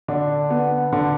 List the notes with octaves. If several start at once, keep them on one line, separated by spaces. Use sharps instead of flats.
D3 D4
B3
D3